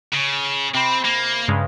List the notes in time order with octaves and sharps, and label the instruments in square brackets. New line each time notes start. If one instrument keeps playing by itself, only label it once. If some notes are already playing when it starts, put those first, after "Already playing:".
[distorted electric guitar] C#3
[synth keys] C3 B5 [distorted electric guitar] C4
[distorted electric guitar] A#3
[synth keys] G2 C#3 G#3